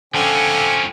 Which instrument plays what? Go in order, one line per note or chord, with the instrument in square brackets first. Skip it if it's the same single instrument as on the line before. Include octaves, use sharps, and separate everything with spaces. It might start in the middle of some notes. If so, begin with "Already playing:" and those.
[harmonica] D3 C4 G#5 [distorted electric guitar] F3 C#4